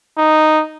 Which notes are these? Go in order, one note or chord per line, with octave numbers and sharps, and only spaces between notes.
D#4